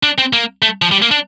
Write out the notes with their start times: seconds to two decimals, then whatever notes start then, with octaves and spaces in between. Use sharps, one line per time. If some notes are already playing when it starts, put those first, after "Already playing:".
0.03 D4
0.18 C4
0.33 A#3
0.62 A3
0.82 F3
0.92 G3
1.02 A#3
1.11 D4